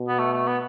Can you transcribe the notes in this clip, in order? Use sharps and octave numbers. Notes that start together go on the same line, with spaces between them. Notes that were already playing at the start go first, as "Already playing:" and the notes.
Already playing: B2
B3
A3
A3
B3